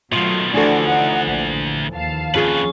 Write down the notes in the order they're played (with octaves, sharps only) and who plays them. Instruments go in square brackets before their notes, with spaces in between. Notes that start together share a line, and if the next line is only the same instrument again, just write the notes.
[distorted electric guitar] B2 D#3 [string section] F#3 A3 [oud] F4
[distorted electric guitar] D2 [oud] E3 F3 A4 [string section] A3 D4 F#4
[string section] D#4 D5 F#5
A#1
D#2 F5 A5
[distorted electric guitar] F2 B4 [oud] C#4 F4 G#4